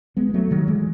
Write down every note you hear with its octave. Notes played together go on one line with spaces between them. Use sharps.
G#3 B3
B3
F#3 A3
D#3 F#3
E3 G#3